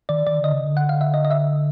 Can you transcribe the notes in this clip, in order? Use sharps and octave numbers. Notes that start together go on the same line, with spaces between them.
D#3 D5
D#3 D5
D3 D#5
C#3
D3
F#5
F5
E5
D#5
D#5
E5